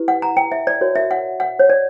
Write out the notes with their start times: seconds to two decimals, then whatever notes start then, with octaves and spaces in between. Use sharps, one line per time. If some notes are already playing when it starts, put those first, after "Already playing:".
Already playing: E4 G4 B4
0.08 F#5
0.22 A#5
0.37 G5
0.52 E5
0.67 D5
0.81 F#4 A#4 C#5
0.95 E5
1.11 F#5
1.40 F#5
1.59 C#5
1.69 D5